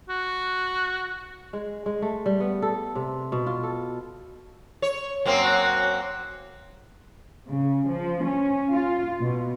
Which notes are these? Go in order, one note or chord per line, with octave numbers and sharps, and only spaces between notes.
F#4
G#3
G#3
A3
G3
B3
A4
C3
B2
F4
A4
C#5
F#2 A#3 C4
F#4
C#3
F3
C#4
F4
B2